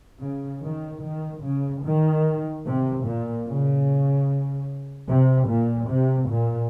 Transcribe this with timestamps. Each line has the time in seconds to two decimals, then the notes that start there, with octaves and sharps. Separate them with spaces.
0.22 C#3
0.63 D#3
1.04 D#3
1.44 C#3
1.85 D#3
2.65 C3
3.06 A#2
3.46 C#3
5.09 C3
5.49 A#2
5.89 C3
6.30 A#2